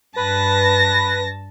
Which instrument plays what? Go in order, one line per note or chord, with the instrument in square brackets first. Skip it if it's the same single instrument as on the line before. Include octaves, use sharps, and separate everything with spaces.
[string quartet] G2 A5 A#6 [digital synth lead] B4